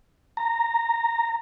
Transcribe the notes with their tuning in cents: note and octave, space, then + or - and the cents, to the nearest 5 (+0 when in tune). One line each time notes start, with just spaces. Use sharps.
A#5 -15